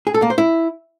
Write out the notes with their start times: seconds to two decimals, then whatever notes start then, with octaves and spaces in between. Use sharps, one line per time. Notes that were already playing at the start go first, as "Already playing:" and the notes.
0.07 G#4
0.14 A4
0.22 A#3
0.30 C5
0.38 E4